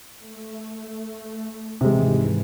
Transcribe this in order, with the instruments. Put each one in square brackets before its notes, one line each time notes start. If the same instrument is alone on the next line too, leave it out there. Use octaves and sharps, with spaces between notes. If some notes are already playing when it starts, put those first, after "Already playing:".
[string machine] A3
[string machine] D#2 G#2 E3 [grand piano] C3 G#3